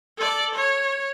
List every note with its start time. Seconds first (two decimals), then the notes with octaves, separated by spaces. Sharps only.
0.18 A4 D5
0.55 C#5